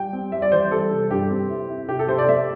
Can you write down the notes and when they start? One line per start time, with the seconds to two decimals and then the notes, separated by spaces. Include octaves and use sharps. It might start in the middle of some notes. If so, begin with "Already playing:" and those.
Already playing: G3 G5
0.13 C4
0.32 G3 E5
0.42 D5
0.52 E3 C5
0.72 G3 A4
0.91 C3
1.10 G2 G4
1.30 C4
1.50 E4
1.69 E4
1.88 C3 G4
1.99 A4
2.09 C3 C5
2.18 D5
2.28 A3 E5